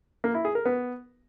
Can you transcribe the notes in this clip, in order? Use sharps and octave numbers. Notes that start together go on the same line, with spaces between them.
A#3
E4
G#4
A#4
B3